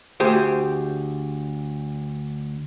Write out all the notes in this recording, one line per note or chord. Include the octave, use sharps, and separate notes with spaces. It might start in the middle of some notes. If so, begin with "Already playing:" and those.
D2 G4 G#4 C5